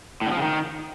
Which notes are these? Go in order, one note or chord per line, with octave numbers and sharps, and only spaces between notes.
A2
D3
F3
C#3
D#3